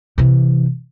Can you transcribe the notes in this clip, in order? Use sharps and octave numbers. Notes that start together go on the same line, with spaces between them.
C3 E3